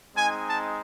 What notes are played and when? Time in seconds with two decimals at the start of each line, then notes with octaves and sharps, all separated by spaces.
0.16 G#3 C4 D#4 G#5
0.47 A5